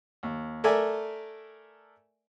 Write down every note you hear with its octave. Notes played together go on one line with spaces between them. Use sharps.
D#2
A3 A4 A#4 D5 E5 G#5